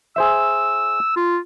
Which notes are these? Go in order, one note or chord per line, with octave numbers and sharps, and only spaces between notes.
G#4 C5 E5 E6
F4